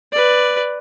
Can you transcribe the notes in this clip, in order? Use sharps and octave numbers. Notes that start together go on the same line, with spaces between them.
B4 D5